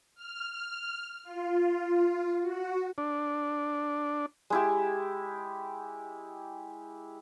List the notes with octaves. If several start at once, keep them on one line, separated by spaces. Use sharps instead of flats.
F6
F4
F#4
D4
G#3 E4 G4